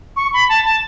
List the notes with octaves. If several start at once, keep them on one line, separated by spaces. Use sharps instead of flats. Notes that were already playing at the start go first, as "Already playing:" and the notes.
C#6
B5
A5
A5